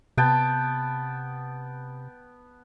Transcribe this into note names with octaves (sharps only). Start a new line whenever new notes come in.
C3 B3 G5 A5